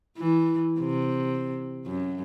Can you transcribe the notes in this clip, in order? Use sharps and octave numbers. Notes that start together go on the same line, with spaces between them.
E3
C3
F#2